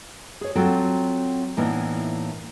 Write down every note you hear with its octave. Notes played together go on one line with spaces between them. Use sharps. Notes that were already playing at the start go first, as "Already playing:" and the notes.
G#4 C#5
F#3 C4 F4 F#4 A4 G5
A2 E3 A#3 B3 D4 D#4